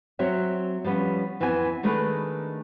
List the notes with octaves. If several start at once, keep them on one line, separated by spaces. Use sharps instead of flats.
F#3 C4 F#4 C#5 E5
F3 G3 B3 C#4
F2 E3 B3 C4 F4 G#5
D#3 G#3 A3 D4 A#4 B4